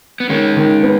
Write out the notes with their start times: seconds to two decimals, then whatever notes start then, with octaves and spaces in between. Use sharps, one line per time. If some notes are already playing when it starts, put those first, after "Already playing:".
0.20 B3
0.29 D#3 G#3 C#4
0.57 D#3
0.83 B3